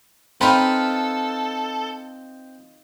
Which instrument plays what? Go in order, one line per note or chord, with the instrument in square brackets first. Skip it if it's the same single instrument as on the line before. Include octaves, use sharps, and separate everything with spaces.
[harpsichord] C4 [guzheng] D#4 F4 B4 [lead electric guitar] A4 [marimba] G5 A#5 B5